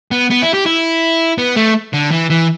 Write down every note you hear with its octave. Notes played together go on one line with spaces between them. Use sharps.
B3
B3
E4
G4
E4
B3
A3
D3
E3
E3